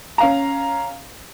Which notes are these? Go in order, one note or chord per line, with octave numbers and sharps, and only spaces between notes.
C#4 F5 A#5